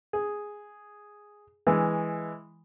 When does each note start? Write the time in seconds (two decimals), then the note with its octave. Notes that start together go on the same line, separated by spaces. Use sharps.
0.13 G#4
1.67 E3 G#3